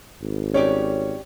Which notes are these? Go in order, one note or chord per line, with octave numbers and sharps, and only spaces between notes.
G#1
C#4 G4 C#5 D5